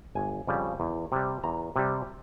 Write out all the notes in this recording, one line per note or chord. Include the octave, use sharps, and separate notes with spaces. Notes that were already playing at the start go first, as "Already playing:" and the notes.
G1 G#5
F2 C#3 G3
E2
C3 G3
E2 A#5
C3 G3